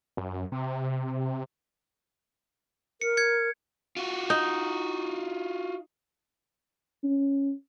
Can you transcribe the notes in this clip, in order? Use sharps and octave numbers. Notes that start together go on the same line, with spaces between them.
F#2
C3
A#4 C#7
G#6 C#7
F4 F#4
D#4
C#4